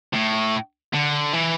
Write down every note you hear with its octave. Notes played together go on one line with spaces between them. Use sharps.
A2
D3
E3